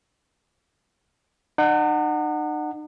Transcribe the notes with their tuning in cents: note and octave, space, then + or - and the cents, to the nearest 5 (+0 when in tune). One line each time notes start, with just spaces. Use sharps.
D#4 -45 F#5 +0